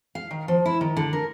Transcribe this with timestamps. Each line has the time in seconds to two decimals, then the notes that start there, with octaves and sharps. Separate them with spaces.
0.15 F5
0.31 D#3
0.48 F3
0.66 E4
0.81 D#3
0.97 D3
1.13 A#4